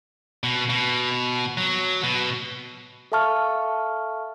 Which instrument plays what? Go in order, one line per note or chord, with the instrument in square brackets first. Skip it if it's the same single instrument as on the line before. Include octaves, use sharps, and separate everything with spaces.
[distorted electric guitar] B2
B2
F#3
B2
[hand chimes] A4 E5 F5 A5 C#6 F6